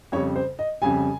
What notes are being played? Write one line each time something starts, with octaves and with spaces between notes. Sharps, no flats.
F2 C#3 G3 C#5
C5
D#5
F2 C#3 G3 G#5